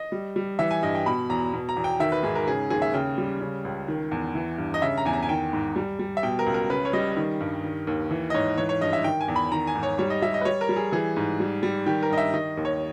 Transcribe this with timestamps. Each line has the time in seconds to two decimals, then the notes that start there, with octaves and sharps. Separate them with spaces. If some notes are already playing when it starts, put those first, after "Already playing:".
Already playing: D#5
0.12 G3
0.36 G3
0.59 E3 E5
0.71 G#5
0.83 G2 D#5
0.95 G5
1.06 B2 B5
1.29 E2 A#5
1.53 B2
1.69 A#5
1.76 E2
1.84 G5
2.00 D#3 E5
2.12 B4
2.23 G#2 G#4
2.35 A#4
2.47 C#3 G#4
2.70 D#2 G#4
2.82 E5
2.94 C#3 G5
3.18 G3
3.41 C#3
3.65 C#2
3.88 D#3
4.12 E2
4.35 E3
4.58 G2
4.74 D#5
4.82 C#3 E5
4.98 A#5
5.05 E2 G#5
5.13 A#5
5.23 G#5
5.29 D#3 G5
5.53 G#2
5.76 G3
5.99 G3
6.17 E5
6.23 B2 G5
6.39 A#4
6.46 C#2
6.54 A#4
6.70 C#3 B4
6.85 C#5
6.93 G3 D#5
7.17 D#3
7.41 G2
7.64 D#3
7.87 D#2
8.11 E3
8.30 D#5
8.34 G#2 C#5
8.58 E3 C#5
8.69 C#5
8.81 G2 D#5
8.93 E5
9.04 D#3 G5
9.21 G#5
9.28 E2
9.36 B5
9.52 D#3 A#5
9.67 G#5
9.75 G#2
9.83 C#5
9.99 G3 C#5
10.10 D#5
10.22 G3 E5
10.34 D#5
10.41 B4
10.45 G3 C#5
10.61 A#4
10.69 G3
10.76 G#4
10.92 E3 G#4
11.17 G#2
11.40 G3
11.63 G3
11.86 D#3 G4
12.03 A#4
12.10 G2 D#5
12.18 E5
12.34 D#3 D#5
12.57 D#2
12.65 C#5